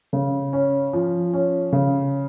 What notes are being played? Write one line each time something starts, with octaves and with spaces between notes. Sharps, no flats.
C#3
C#4
F3
C#4
C#3